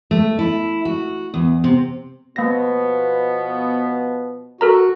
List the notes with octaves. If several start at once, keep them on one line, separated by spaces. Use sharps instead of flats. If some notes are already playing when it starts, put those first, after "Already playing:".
A3
E4
F#4
E2
C3
B2 F3 A#3 B3 A#6
F#4 A4 A#4 A#5